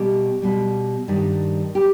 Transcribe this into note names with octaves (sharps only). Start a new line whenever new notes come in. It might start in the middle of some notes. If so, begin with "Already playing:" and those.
Already playing: B2 G3 G4
B2 G3
G2 D#3 G3
G4